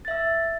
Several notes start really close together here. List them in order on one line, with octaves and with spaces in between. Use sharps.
A6 E5 E6